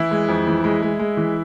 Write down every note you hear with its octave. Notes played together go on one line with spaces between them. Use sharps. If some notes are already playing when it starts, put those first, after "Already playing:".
Already playing: E3 E4
G#3
F2
E3
G#3
G#3
G#3
E3